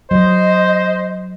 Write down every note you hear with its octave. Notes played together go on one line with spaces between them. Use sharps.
F#3 C5 D#5